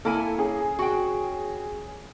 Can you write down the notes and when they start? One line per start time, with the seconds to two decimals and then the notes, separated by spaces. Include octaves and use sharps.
0.05 A#3 E4 A4 G#5
0.38 C#4 G#4
0.79 F#4 G5